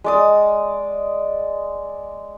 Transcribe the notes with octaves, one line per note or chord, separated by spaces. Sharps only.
G#3 D5 D#6